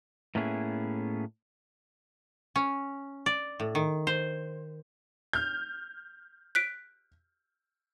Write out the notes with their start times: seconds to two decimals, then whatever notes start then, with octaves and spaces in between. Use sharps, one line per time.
0.35 A2 A#3 B3 C#4 E4 G#4
2.56 C#4
3.26 D5
3.60 A2
3.75 D#3
4.07 C5
5.33 F6 G6
6.55 F#6 B6 D7